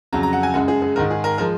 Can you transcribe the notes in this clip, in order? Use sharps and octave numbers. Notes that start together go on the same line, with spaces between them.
F2 C#3 F#3 A#5
A#5
F#5
G#5
F#2 C#3 G#3 F#5
G#4
G#4
G#2 D#3 G#3 A#4
G#4
A#4
F3 G#3 A#4